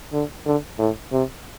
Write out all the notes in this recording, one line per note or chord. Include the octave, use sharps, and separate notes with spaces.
D3
D3
A2
C3